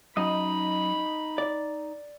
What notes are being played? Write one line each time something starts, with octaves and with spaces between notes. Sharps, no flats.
F#2 D#4 D#5 B5
D5